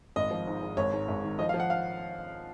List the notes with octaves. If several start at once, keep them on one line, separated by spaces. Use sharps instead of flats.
G#1 D#5
F3
G#2
G#2
G#1 C#5
G#2
G#1
D#3
F3 D#5
F5
F3
F#5
F5